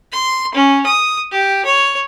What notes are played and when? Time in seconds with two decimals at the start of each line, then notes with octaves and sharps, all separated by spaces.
0.12 C6
0.55 C#4
0.86 D#6
1.31 G4
1.65 C#5